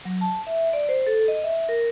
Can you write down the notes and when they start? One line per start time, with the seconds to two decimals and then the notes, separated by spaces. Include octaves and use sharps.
0.05 F#3
0.21 A5
0.47 E5
0.73 D5
0.89 C5
1.07 A4
1.28 D#5
1.44 E5
1.69 A#4